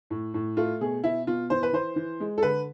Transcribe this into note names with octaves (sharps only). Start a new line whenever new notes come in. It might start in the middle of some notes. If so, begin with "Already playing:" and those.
A2
A2
A3 F4
B2 G#4
B2 E4
B2 F4
E3 C5
B4
E3 C5
E3
G#3
A4
D3 B4